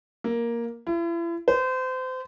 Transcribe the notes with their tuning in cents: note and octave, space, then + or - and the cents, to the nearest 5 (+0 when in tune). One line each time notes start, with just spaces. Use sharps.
A#3 +5
E4 +40
C5 -30